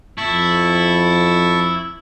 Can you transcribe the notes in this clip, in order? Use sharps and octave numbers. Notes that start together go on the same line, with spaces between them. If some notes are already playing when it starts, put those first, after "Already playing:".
F2 E4 A5 C#6